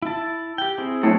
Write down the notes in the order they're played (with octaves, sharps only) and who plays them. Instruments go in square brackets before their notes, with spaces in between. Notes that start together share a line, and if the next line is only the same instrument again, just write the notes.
[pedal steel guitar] E4 A5
G4 G5
C4 E4 G#4
[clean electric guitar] F#2 A2